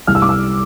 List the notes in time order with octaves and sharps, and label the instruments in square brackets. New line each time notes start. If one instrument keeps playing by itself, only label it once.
[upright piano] C2 F6
E6
D6
E6